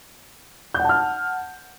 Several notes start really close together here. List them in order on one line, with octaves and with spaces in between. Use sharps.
G6 F#5 A5 F6